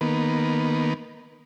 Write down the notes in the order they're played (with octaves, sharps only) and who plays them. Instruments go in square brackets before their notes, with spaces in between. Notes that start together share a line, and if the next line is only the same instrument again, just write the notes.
[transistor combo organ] D#3 A#3 B3